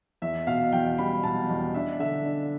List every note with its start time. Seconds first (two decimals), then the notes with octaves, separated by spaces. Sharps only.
0.22 E2 E5
0.47 B2 F5
0.72 E2 G5
0.99 G3 B5
1.24 B2 A5
1.49 E2
1.74 D4 E5
1.99 D3 E5
2.25 D4